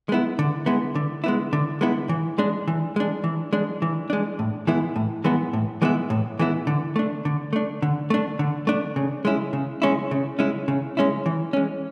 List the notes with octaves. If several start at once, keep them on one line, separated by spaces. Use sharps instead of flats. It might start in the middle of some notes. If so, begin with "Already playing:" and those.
G#3 B3 E4
D3
G#3 B3 E4
D3
G#3 B3 E4
D3
G#3 B3 E4
E3
G#3 D4
E3
G#3 D4
E3
G#3 D4
E3
G#3 D4
A2
E3 G#3 B3 E4
A2
E3 G#3 B3 E4
A2
E3 G#3 B3 E4
A2
E3 G#3 B3 E4
D3
A3 D4
D3
A3 D4
D3
A3 D4
D3
A3 D4
C#3
G#3 C#4 E4
C#3
G#3 C#4 E4
C#3
G#3 C#4 E4
C#3
G#3 C#4 E4
E3
G#3 C#4